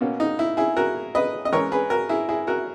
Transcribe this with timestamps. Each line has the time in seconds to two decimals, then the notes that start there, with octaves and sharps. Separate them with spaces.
0.01 B2 A#3 C#4
0.20 D#4
0.39 E4
0.57 E4 G#4
0.77 F#4 A#4
1.15 B4 D#5
1.45 D#5
1.52 E3 G#3 C#4 A#4 C#5
1.72 G#4 B4
1.90 F#4 A#4
2.09 E4 G#4
2.28 E4 G#4
2.47 F#4 A#4